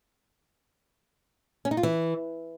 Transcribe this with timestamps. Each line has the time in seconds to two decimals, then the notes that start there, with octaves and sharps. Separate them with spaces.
1.65 C#4
1.71 D#4
1.77 F4
1.83 E3